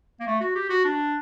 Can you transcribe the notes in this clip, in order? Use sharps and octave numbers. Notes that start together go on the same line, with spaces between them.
A#3
A3
F#4
G4
F#4
D4